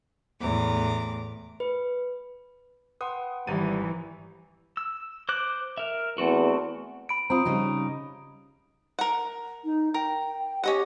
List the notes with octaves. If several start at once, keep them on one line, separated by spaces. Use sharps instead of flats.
E2 A2 A#5 D6
B4
B4 F#5 G5 C6 D#6
G#1 E3 G3 B4 A#5 A6 D#7
E6
C5 D6 F#6
A#4 E5
E2 A3 C4 F#4
B5 D7
C4 F4 A#5 B5 D#6
C#3 G3 D#4
A#4 F#5
D#4
A#4 G5
C#4 G4 D#5 F#5